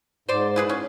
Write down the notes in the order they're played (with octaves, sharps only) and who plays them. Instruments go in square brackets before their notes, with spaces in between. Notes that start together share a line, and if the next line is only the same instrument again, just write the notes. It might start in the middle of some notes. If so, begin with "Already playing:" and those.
[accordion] G#2 [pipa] C5 D5
[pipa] E4 G#4 B4
C#4